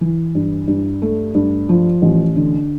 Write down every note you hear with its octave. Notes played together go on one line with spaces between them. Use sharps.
E3
G2
G2
A3
G2
F3
A1
D3